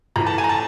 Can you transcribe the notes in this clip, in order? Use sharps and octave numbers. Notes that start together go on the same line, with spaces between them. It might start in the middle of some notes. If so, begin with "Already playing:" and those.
A2 E3 A3 A#5
A5
G#5
A#5
A5